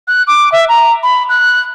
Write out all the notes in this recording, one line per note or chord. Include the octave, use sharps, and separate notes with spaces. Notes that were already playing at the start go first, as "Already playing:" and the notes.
F#6
D6
E5
A#5
B5
F#6